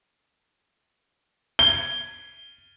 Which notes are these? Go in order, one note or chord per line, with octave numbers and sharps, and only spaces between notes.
G7